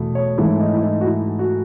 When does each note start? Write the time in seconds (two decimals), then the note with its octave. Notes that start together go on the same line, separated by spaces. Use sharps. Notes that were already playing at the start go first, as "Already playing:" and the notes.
Already playing: E2 B2 A3
0.15 C#5
0.38 G#2 E3 A3 E4
0.60 D#4
0.75 E4
0.83 D#4
1.01 F#4
1.05 E4
1.39 F#4